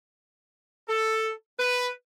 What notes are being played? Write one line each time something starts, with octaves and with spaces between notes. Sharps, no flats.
A4
B4